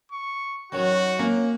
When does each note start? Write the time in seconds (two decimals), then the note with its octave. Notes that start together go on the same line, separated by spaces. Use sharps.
0.12 C#6
0.72 D#3 F#3 C#4 F#4 C#5
1.19 A#3 C4 C#4